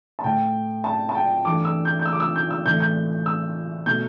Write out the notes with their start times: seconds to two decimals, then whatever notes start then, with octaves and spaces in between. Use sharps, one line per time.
0.19 A5
0.24 A2 A3 G5
0.84 A5
1.09 A5
1.15 G5
1.45 G2 E3 A3 D6
1.65 E6
1.85 G6
1.99 G6
2.05 E6
2.13 D6
2.20 E6
2.36 G6
2.51 E6
2.65 A2 E3 A3 G6
2.80 G6
3.26 E6
3.86 B2 A3 G6